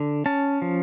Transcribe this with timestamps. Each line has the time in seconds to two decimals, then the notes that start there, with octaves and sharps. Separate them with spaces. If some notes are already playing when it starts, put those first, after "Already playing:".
Already playing: D3
0.26 C#4 A5
0.62 F3